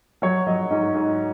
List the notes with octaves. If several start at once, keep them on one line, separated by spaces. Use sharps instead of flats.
F#3 C#5
F#3 D#5
G#2 D#5
G#2